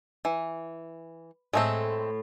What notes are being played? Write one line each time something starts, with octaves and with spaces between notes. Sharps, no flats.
E3
A2 G#3 A3 C4